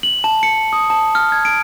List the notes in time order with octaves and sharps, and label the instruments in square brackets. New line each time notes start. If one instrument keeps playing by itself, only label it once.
[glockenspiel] F#7
A5
C#7
D#6
A5
F6
G#6
D7